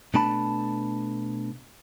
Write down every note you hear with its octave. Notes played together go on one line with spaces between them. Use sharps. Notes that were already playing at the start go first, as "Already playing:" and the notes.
B2 A3 D4 A5 B5